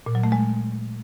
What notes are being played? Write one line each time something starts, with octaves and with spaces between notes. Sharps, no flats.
A#2
F#3
A3
G#3